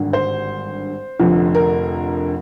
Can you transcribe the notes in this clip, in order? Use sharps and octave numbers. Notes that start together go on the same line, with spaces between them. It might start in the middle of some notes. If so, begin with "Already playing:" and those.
Already playing: G#1 G2 D3
C5
F1 F2 D3 F3
A#4